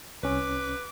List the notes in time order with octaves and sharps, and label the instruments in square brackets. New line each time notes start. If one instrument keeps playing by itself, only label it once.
[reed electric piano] C2 C#4 [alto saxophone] B4 [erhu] D6